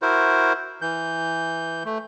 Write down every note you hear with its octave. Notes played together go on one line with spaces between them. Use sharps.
E4 F#4 A#4 C5
E3 G6
A3